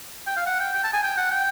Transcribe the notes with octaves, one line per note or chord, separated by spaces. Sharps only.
G5
F5
F#5
G5
G5
A5
G#5
G5
F#5
G5